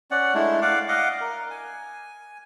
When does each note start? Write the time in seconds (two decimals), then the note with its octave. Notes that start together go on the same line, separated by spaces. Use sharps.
0.11 C#4 D5 F#5
0.35 G#3 A3 D4 E4
0.62 D5 F5 F#5 D6
0.88 D#5 F5 F#5 D6
1.21 A#4
1.50 G#5